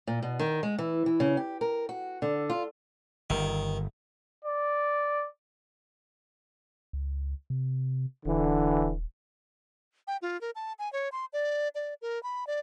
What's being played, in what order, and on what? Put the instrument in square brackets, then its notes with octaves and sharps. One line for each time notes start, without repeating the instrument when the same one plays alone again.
[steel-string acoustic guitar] A#2
B2
D#3
G#3
E3
E3
C#3
G4
A#4
F#4
D3
F4
[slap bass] G1 [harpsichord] D#3
[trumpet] D5
[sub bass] C#2
C3
[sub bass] D#1 [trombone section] D3 E3
[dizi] G5
F4
A#4
A5
G#5
C#5
C6
D5
D5
A#4
B5
D5